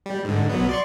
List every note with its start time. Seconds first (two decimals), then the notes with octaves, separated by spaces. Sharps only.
0.06 G3
0.24 G#2 D3
0.50 B1 F#3 B3
0.69 D5 C6 C#6